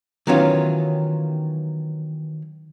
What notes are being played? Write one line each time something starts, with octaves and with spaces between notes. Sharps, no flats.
D#3 E3 F#3 B3 C#4 F4